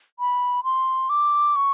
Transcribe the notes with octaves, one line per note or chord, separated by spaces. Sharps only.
B5
C6
D6
C#6